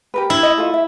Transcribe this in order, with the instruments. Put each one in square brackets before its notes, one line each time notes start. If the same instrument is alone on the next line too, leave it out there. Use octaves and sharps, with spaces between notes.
[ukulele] G4 A#4 B4
[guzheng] E4
[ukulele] D#5
F4 A4
E5